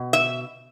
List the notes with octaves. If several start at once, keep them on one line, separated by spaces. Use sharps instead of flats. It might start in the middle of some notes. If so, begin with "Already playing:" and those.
Already playing: B2
E5